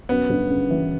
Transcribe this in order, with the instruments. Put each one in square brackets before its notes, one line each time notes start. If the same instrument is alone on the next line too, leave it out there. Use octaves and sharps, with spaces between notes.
[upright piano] F#2 [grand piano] B3
[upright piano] G1
C#3
E3